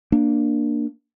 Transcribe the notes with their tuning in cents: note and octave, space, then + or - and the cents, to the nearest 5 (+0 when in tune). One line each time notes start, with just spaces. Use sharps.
A#3 +0 D4 +5